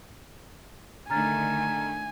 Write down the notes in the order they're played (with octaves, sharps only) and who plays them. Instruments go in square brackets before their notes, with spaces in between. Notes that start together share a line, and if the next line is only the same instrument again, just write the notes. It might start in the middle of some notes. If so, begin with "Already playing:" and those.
[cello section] D3 D#3 A3 [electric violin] G#5 [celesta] A#5 F6 A6